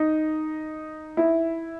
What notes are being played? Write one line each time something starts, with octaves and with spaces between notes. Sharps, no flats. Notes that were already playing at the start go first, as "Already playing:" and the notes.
Already playing: D#4
E4